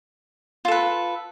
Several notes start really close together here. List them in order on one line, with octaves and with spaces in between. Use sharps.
F4 A4 B4